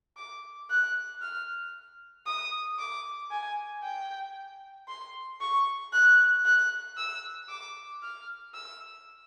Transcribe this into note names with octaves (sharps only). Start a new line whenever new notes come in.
D6
F#6
F6
D#6
D6
G#5
G5
C6
C#6
F#6
F#6
E6
D6
F6
E6